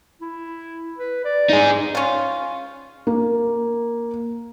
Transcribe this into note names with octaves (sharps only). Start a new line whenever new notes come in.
E4
B4
D5
D#4 G#4
C#4 F4
A#3